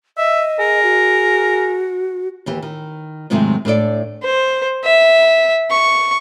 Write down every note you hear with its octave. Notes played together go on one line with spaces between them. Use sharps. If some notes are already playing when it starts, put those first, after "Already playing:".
D#5 E5
G#4 A#4
F#4
D#2 E3 G4
D#3
G#2 C3 D#3 F#3 G#3 A3
A2 D4 A4 D5
C5
E5
C#6